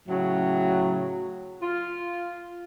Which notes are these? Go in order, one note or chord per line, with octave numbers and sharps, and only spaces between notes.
A2 C#3 F#3
F4